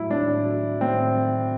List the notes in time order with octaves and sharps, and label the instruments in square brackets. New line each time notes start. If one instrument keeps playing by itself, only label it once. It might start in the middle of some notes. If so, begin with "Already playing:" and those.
Already playing: [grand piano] A2 F#3 E4
A2 D4
F#3
A2 C4
F#3